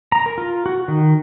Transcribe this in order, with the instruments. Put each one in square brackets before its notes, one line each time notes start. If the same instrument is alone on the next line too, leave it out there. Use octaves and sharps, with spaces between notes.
[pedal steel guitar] A#5
A#4
F4
F#4
D#3